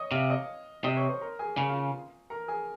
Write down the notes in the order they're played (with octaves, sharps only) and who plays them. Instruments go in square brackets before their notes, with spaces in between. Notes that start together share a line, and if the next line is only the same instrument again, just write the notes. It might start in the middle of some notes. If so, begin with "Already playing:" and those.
Already playing: [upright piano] C#5 D#5 D#6
[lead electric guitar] C3 [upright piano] F5 F6
[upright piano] D#5 D#6
[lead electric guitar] C3 [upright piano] D#5 D#6
[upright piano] C#5 C#6
C5 C6
A#4 A#5
G#4 G#5
[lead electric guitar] C#3 [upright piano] G#4 G#5
[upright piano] F4 F5
A#4 A#5
G#4 G#5